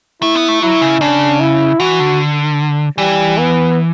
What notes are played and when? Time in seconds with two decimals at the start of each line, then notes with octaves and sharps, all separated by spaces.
0.22 A3 E4
0.35 B3
0.48 A3
0.62 F#3 E4
0.82 C#3
1.01 C#3 D4
1.40 E4
1.80 E3 F#4
2.00 D3
2.98 E3 G3
3.38 B3